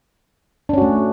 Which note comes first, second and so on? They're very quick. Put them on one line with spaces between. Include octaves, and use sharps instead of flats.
D4 C#4 F#4 A3